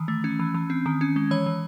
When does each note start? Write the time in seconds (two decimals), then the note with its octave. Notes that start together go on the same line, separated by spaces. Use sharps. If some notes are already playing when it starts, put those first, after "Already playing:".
Already playing: D#3 E3
0.08 A3
0.24 C#4
0.39 E3
0.54 E3
0.70 C4
0.86 D#3
1.01 C#4
1.16 G#3
1.31 E3 C#5
1.46 E3